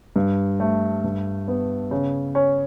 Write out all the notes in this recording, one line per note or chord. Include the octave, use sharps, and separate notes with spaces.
G2
A3
G2
B3
C#3
C#4